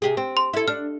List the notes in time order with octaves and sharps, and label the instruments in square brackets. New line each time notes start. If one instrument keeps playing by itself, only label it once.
[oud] C3 G4 G#4
C4
[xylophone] C6
[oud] E4 A4
[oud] D4 [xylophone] F6